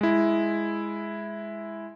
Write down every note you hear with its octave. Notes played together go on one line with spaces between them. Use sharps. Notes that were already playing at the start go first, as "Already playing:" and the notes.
G#3 E4